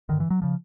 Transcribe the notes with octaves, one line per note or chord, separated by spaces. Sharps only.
G2 D3 D#3
E3
F#3
C#3 F3